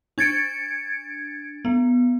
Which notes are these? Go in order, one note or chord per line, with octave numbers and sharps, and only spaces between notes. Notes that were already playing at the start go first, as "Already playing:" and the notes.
D4 G#6 A6 C#7 D7
B3